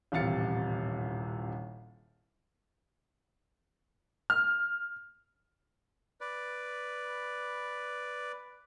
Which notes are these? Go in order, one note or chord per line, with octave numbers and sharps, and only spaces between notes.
D#1 A1 C3 F5 A6 C#7
F6
B4 D5